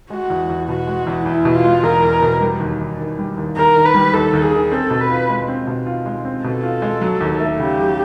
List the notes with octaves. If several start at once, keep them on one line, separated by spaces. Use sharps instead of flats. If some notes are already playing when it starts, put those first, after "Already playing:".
G#3 F#4
E2
E2
B2 F#4
G#3
E2
E2 E4
B2
F4
G#3
E2 A#4
E2
B2
G3
D#2
D#2
D#3
G3
D#2
D#2 A#4
D#3
B4
G3
D#2 A4
D#2
G#4
D#3
C4 A4
B2
B4
F4
G#3
C4
B2
F4
G#3
C4
B2 A4
F4
G#3
F#3
D#2
A3
C#3 G4
F#3